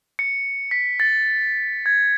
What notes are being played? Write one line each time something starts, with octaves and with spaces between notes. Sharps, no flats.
C#7
B6
A6
G#6